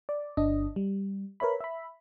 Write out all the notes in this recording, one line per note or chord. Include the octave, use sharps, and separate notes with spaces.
D5
G1 D4 D#5
G3
A#4 B4 C#5 E5 B5
E5 B5